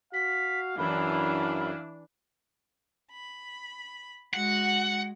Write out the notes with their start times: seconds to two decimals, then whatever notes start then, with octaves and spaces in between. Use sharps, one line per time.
0.13 F#4 F5 B6
0.78 F#2 E3 D4 E4 F5 B5
3.12 B5
4.33 G#3 F#4 F#5